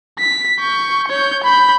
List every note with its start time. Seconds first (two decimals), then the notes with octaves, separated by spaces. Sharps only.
0.20 B6
0.59 C#6 G6
1.08 C#5 G6
1.44 B5 G6